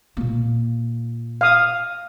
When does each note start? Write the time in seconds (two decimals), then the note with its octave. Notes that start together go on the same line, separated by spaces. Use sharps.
0.17 A#2 A#3
1.41 F5 D#6